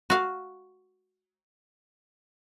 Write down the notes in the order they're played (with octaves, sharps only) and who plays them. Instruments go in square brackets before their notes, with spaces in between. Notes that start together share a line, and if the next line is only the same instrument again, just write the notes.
[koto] F#4 F5